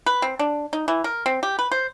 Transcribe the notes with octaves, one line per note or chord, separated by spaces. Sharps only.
B4
C4
D4
D#4
E3
A#4
C4
G4
B4
C5